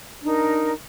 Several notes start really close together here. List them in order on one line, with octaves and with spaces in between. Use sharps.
D4 D#4 A#4